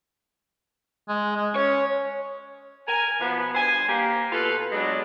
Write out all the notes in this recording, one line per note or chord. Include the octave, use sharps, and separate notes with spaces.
G#3
G#3
C#4 C#5
A#4 G#5
B2 F3 B3
G2 C5 G#5
A#3 G4
B2 F4 A4 B4
F#3 G#3 B3 D4